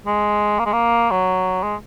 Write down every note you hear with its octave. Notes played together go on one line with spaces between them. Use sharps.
G#3
A#3
G#3
A#3
F#3
G#3